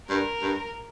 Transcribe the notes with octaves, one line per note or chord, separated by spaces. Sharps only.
G2 A#4
G2